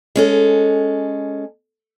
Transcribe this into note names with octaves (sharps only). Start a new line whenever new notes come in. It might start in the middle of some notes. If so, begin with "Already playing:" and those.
G#3 C#4 A4